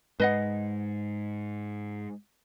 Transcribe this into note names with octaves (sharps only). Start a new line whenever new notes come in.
G#2 G#3 B4 D#5 F#5